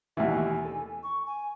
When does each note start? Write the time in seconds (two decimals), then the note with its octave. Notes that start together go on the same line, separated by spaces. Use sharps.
0.17 D#2 B2 E3 E5
0.31 G#5
0.65 A4
1.03 C#6
1.26 G#5